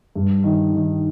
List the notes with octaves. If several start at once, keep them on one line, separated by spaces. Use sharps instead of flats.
G2
D#3
D#3